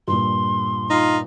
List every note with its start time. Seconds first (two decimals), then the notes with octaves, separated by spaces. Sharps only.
0.08 G2 A#2 C6
0.90 D#4 F4